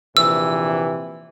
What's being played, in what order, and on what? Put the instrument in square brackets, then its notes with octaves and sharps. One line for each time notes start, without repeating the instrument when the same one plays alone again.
[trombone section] A#1 C3 E3 [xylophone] E6